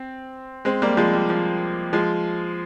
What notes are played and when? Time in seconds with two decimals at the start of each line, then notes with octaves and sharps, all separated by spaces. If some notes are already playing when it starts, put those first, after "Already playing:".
Already playing: C4
0.65 G#3 C4
0.82 G3 A#3
0.97 F3 G#3
1.13 G3
1.29 F3
1.93 F3 G#3